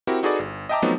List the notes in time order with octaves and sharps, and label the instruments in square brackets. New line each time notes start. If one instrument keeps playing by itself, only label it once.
[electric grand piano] C4 E4 F#4 G4 A#4
D#4 F#4 G#4 A4 B4 D5
G1
D#5 E5 G5 A5 A#5 D6
F3 F#3 A3 B3 C4 D#4